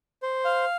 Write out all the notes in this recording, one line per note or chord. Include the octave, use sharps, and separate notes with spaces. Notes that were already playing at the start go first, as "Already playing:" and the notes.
C5
F5